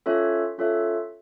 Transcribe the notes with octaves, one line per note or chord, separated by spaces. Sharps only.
C#4 F4 A4 C#5 E5
C#4 F4 A4 C#5 E5